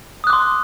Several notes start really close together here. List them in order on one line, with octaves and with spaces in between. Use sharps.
D#6 F#6 D6 C6